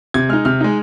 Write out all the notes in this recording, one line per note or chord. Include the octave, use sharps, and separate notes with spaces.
C3 G#6
G#3 D#4 F6
C3 F6
G#3 D#4